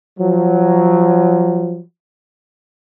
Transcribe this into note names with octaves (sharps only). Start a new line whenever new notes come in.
F3 F#3